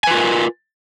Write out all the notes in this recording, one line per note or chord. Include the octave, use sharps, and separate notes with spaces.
F4 A#4 B4 G#5